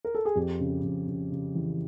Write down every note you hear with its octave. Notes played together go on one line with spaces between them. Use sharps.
A#4
A4
G#4
F2 G4
C#3
F2
C#3
C#3
E3